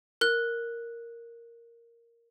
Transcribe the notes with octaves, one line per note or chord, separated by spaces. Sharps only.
A#4 F#6